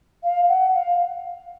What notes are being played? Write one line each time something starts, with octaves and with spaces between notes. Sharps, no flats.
F5
F#5
F5